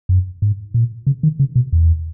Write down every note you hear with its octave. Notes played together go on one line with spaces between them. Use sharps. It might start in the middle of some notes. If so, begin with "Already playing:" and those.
F#2
G#2
A#2
C#3
D#3
C#3
B2
E2